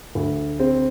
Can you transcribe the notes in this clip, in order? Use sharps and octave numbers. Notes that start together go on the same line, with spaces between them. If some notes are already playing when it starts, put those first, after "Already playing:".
D2
C4